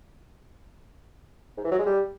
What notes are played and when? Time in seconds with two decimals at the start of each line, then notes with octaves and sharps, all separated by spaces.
1.57 G#2
1.64 E3
1.71 F#3
1.79 G#3
1.86 G3